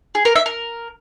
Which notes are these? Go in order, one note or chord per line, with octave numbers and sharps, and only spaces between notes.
G#4
A#4
E5
A#4